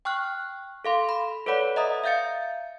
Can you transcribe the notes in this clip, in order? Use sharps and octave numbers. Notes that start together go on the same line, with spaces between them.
G5 C#6 F6 F#6
A4 F5 C6
B5
A4 B4 C#5 D5 F#5 B5
D#5 E5 A#5 D#6
E5 F5 G6 A6 C#7